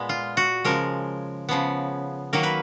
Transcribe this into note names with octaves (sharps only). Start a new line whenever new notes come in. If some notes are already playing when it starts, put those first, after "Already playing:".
Already playing: A#2 G#3 B3
F4
F#4
C#3 F3 G#3 A#4
C#3 F3 B3
D#3 F#3 A#3 A#4
B4